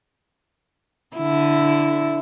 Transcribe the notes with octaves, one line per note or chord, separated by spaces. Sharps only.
D3 E4